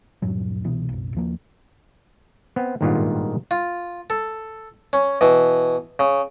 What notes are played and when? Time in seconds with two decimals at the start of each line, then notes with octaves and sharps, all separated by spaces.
0.22 D#1 G2 A#2 F#3
0.64 C2 B2 E3 B3
0.89 F#1 B1
1.15 D#2 F3 A#3
2.56 B3 C4
2.81 G#1 G2 A#2 D#3 B3 F4
3.51 F4
4.10 A4
4.93 C#4
5.21 B2 E3
5.99 C#3